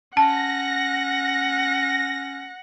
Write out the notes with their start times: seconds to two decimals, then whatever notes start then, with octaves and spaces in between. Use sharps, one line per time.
0.17 C#4 F#5 A5 A#6